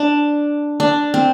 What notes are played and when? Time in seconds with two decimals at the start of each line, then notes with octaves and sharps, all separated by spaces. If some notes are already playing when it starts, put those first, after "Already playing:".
Already playing: D4
0.80 D4
1.14 C4